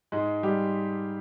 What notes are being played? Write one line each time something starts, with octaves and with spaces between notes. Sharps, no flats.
G#2 G#3
G3 G4